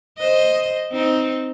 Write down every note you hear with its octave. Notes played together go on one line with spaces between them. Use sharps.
C5 D#5
C4 D#4